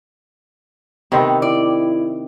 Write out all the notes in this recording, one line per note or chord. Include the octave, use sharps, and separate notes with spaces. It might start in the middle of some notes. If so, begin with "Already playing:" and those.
C3 D#3 B3 C4
E4 D5